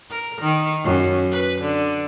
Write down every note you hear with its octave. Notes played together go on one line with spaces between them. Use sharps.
A#4
D#3
F#2
B4
D3